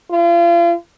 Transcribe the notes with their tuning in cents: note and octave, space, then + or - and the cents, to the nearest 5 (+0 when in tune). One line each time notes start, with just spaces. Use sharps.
F4 -35